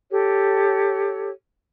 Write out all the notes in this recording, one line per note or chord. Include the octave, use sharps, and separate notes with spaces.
G4 A4 C#5